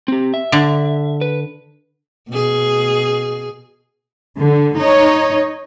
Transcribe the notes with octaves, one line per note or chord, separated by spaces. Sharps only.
C4 G4
E5
D3
B4
B2 G#4
D3
D#4 C#5